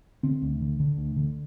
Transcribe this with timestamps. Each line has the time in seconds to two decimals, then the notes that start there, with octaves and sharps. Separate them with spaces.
0.23 D3 C4
0.42 D2
0.61 D3
0.80 D3
0.97 D2
1.17 D3